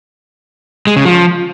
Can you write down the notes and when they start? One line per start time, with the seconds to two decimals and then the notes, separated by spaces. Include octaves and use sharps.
0.87 G#3
0.96 C#3
1.05 F3